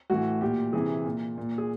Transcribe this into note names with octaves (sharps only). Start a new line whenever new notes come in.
A2 E3 F#4
A#2 G4
C3 E3 G#4
A#2
A#2
G#4